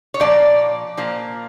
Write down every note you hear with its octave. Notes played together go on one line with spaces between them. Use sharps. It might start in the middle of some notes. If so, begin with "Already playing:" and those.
C#5
A#2 F3 A#3 D5
A#2 F3 A#3